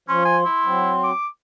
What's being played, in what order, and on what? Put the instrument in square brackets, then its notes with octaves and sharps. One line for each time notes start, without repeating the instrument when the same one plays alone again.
[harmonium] F3 [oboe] C#4 [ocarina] C6
[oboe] G#5
E4
[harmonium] F#3 C4
[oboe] D6